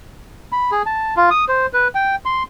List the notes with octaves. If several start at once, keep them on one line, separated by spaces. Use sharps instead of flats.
B5
G#4
A5
F4
D#6
C5
B4
G5
C6